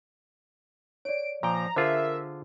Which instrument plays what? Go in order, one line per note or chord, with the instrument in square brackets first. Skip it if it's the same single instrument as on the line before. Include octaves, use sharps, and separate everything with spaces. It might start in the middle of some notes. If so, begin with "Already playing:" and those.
[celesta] C#5 D5 [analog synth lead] D7
[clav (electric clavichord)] A#2 G5 [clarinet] F3 [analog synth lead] A#5
[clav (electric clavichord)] D3 F4 G#4 [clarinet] A#4 [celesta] C5 [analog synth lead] E5